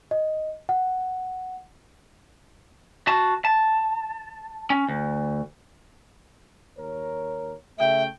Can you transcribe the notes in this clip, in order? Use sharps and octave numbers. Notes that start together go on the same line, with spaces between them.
D#5
F#5
F#4 A5
A5
C#4
D2
D#2 A#4 C#5
C#3 A3 F#4 E5 G5